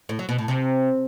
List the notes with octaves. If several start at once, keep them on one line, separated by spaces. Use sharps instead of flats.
A2
F#3
B2
A2
C3